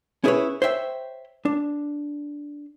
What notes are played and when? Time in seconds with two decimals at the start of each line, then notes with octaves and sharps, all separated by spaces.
0.24 C#4 E4 G#4 A4 B4 C#5
0.62 C5 C#5 E5 G5
1.45 D4